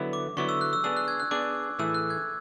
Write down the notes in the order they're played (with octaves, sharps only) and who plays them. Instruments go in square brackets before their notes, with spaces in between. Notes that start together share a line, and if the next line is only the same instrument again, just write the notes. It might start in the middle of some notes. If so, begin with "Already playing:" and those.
Already playing: [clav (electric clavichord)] D3 F#3 B3 E4
[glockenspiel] D6
[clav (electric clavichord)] D3 F#3 B3 E4 [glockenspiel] C#6
[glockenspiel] E6
F#6
E6
[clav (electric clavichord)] B3 D4 G#4 [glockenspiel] E6
[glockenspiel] F#6
G#6
F#6
[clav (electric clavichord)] B3 D4 G#4 [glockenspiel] D6
[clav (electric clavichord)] A2 E3 A3 E4 G#4 [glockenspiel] E6
[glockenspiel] F#6
G#6